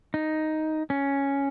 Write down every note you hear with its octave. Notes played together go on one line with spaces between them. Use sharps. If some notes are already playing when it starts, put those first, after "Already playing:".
D#4
C#4